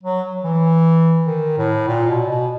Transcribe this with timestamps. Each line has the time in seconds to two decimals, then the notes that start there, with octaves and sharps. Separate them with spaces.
0.03 F#3
0.44 E3
1.27 D#3
1.58 A2
1.88 A#2
2.09 B2
2.29 B2